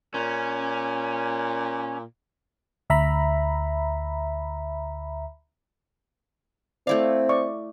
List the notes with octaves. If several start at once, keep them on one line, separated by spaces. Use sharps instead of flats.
A#2 C#4
D2 E5 A#5 B5
A3 C4 E4 D5 F5
D5 C#6